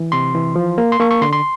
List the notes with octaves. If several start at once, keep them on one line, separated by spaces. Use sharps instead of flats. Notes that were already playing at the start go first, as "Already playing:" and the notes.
Already playing: E3
C3 C6
E3
F3
A#3
C6
A#3 C#6
C#6
D3 C6
C6